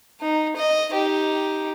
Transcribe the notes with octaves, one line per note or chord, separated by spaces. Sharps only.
D#4
D#5
D#4 G4